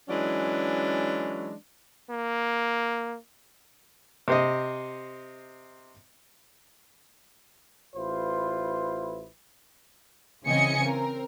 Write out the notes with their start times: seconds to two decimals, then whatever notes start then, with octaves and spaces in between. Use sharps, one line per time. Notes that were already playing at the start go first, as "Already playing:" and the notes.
0.08 E3 F#3 G#3 C#4 D4
2.10 A#3
4.28 C3 C5 D#5
7.95 A1 E4 F4 B4 C5
10.44 C#3 E3 C4 D#5 G#5 C#7
10.81 C4 A#4